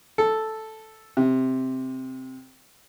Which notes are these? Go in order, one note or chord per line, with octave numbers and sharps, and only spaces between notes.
A4
C3